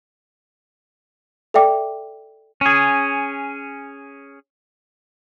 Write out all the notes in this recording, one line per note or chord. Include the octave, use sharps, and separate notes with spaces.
A4 D5 E5 G5 D6
C#4 G#4